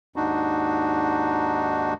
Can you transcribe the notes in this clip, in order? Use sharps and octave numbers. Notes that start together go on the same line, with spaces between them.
D#2 G#2 D4 D#4 F#4